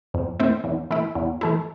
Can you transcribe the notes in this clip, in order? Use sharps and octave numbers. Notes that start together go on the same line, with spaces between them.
F2
E3 A3 C4
E2
E3 A3 E4
E2
E3 A3 E4